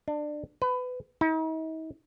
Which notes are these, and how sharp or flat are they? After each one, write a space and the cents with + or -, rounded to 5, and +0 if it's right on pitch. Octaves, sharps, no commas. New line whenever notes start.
D4 +25
B4 +25
D#4 +45